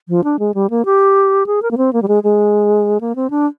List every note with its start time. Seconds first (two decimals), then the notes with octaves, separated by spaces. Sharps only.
0.09 F3
0.24 D4
0.39 G#3
0.54 G3
0.70 A#3
0.85 G4
1.47 G#4
1.62 A#4
1.71 A#3
1.78 C4
1.93 A#3
2.02 G3
2.08 G#3
2.23 G#3
3.01 A#3
3.16 C4
3.30 D4